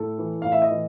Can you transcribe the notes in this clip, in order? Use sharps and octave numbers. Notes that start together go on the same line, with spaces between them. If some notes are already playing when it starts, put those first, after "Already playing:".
Already playing: A2 A4
E3
A2 F5
E5
D#5
E3